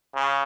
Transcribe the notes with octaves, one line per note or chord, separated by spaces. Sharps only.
C#3